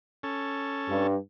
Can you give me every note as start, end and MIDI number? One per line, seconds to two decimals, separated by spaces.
0.23 1.07 61
0.23 1.07 69
0.89 1.17 43